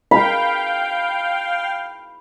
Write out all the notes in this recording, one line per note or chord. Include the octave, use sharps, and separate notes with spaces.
F5 G5 B5